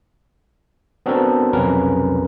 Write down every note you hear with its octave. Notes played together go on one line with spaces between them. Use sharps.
B3 C4 D4 F#4 A4 A#4
B1 F2 C3 C#4 A#4 B4